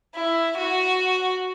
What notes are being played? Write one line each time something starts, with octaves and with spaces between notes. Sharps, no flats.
E4
F#4